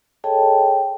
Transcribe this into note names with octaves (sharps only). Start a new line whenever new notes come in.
G#4 A4 C#5 D#5 G5 A5